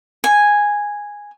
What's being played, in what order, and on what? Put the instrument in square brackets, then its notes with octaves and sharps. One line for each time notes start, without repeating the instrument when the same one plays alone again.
[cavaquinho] G#5